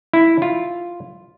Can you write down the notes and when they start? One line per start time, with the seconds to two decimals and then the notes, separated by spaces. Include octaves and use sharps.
0.13 E4
0.42 F4